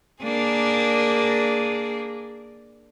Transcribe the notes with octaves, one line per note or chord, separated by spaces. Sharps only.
A#3 D4 G#4